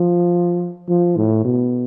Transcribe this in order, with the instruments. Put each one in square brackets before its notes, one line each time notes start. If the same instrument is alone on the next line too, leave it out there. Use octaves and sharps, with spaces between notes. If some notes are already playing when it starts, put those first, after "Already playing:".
Already playing: [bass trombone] F3
F3
A2
B2